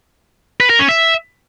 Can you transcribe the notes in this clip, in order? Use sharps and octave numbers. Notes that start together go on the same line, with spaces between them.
B4
A#4
C#4
E5